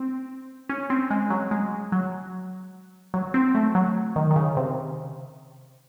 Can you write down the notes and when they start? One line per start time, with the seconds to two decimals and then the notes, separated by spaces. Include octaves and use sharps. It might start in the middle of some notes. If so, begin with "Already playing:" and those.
Already playing: C4
0.69 C#4
0.90 C4
1.10 G#3
1.30 F#3
1.51 G#3
1.92 F#3
3.14 F#3
3.34 C4
3.55 A3
3.75 F#3
4.16 D#3
4.31 D#3
4.36 C#3
4.57 C3